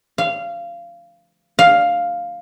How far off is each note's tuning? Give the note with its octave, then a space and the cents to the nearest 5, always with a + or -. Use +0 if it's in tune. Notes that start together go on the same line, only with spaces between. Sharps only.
F5 -20
F5 +5